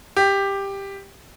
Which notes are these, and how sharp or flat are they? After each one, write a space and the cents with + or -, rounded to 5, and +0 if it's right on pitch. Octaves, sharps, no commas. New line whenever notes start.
G4 +10